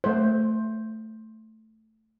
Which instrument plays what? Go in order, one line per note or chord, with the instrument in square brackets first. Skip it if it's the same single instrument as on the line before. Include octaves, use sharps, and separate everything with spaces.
[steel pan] A3 C5